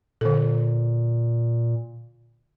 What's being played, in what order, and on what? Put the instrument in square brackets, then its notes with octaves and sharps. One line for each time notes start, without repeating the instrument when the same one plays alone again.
[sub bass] A#2 [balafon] D3 A4